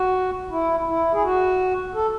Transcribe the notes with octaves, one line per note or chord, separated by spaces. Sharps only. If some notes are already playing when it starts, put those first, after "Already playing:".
Already playing: F#4
E4
E4
G#4
F#4
A4